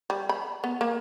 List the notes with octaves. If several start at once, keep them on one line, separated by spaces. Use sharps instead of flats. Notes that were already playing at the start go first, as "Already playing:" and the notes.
G3
B5
B3
A#3